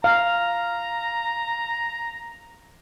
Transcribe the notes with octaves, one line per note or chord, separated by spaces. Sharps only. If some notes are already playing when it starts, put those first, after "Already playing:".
F5 A#5